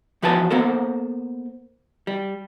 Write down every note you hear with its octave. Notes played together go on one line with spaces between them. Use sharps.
E2 F3 F#4 B4 G#5 A5
A#3 B3 A4 A#4 C5
G3